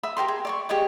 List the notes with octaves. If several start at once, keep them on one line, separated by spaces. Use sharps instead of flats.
E5 B5 D#6
G4 A#4 G5 C6
G#4
D5 C6 C#6
G4 G#4 C#5 D#5